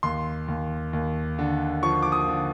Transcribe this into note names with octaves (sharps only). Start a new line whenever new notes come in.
D#2 C6
D#2
D#2
D3
F3 C#6
D6
D#6
D3